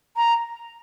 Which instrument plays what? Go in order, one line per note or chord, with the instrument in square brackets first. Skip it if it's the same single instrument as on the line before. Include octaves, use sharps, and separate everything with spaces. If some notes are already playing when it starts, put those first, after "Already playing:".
[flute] A#5